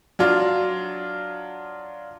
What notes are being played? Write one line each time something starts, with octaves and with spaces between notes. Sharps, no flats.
F#3 D4 F4